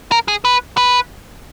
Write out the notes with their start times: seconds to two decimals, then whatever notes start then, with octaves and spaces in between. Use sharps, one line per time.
0.12 A#4
0.28 G#4
0.45 B4
0.77 B4